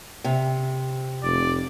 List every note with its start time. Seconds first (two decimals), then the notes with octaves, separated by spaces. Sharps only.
0.24 C3
1.24 F1 D5